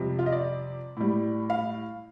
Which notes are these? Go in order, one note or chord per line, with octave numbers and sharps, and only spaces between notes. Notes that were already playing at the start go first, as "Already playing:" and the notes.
Already playing: F2 C3 G3
F4
D#5
D5
A2 G3
F5